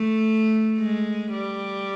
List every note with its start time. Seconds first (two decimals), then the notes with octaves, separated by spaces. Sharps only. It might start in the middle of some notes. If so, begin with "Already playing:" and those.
Already playing: A3
0.79 G#3
1.32 G3